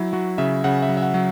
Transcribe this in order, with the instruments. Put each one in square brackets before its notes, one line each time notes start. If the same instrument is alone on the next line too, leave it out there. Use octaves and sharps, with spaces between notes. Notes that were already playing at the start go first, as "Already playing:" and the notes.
Already playing: [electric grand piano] F#3 E4
F#3 F#4
C#3 E5
C#3 F#5
E5
F#3
E5
F#5
F#3